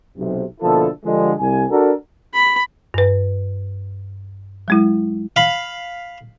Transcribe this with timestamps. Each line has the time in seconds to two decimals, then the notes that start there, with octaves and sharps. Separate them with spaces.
0.17 B1 C3
0.61 B2 D3 F3 A#3 E4 A4
1.04 D3 F3 G3 G#3
1.39 C2 G3 G#5
1.69 D4 F#4 A4 A#4
2.34 B5
2.94 G2 B4
4.68 F#3 G#3 E4
5.36 F5 B5